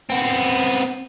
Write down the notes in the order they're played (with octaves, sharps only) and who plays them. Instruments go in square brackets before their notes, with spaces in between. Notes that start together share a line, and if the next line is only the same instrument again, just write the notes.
[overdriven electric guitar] B3 C4